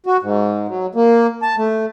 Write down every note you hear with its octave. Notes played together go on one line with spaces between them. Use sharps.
F#4
G#2
F#3
A#3
A5
A3